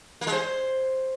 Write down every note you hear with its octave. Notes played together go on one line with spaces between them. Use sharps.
A#3
G#3
C5